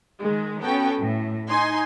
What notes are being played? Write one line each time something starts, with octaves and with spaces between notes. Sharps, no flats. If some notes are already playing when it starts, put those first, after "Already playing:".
D#3 G#3
B3 C#4 F#4 A4 G5
A2
D#4 G#5 C6